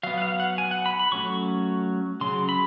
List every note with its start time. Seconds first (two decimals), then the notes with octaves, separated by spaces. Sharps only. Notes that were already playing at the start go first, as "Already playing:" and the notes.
0.03 F#3 B3 F5
0.18 F#5
0.22 F5
0.40 F#5
0.58 G#5
0.71 F#5
0.86 B5
0.99 B5
1.12 F#3 A3 C#4 C#6
2.21 C#3 F#3 C6
2.49 B5